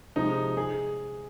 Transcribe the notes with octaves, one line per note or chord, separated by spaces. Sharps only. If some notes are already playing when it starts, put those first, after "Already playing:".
C3 F3 G#3 D#4
G#4